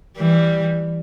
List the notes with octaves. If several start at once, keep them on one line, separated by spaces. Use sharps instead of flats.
E3 G3